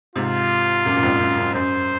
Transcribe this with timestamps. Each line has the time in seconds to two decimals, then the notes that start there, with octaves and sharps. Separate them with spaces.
0.16 G#2 C3 F4
0.86 F#2 A#2
0.96 A#2
1.03 F2 G#2
1.20 F#2
1.38 F#2
1.55 F#2 C5